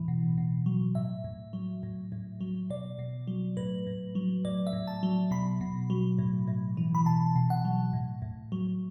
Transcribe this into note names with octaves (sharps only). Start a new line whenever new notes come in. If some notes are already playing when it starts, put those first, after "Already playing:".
Already playing: A2 E3
B2
B2
F#3
A2 E5
A2
F#3
A2
A2
F#3
B2 D5
B2
F#3
A2 B4
A2
F#3
A2 D5
E5
A2
A5
F#3
B2 B5
B2
F#3
A2
A2
E3
B5
B2 A5
B2
F#5
F#3
A2
A2
F#3